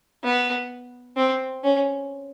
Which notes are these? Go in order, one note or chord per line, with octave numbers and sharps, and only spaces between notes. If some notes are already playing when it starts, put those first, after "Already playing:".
B3
C4
C#4